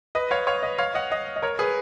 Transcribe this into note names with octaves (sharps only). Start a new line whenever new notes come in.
B4 D#5
C#5 F5
C#5 F5
B4 D#5
C#5 F5
D#5 F#5
D#5 F#5
D#5
A#4 C#5
G#4 B4